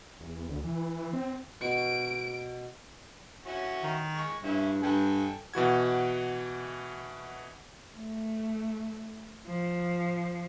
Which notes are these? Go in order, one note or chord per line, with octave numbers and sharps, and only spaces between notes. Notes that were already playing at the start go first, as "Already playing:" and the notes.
E2
D2
E3
C4
B2 B5 C#6 D7
C#4 E4 F#4
D#3
G#3 C#6
G2 C#4 E4
G2 A4 G5 G#5
B2 E3 F#4 G#6
A3
F3